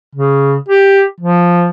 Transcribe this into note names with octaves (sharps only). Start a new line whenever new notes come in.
C#3
G4
F3